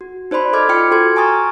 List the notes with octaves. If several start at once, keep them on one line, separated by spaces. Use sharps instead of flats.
F#4
D#4 C5 D5 B5 C6
A4 D#5 B5 D6 F6 G#6
F4 G5 D6 F6 C#7
F#4 A4 C6 G#6
G#5 A#5 C#6 D#6 F6 A6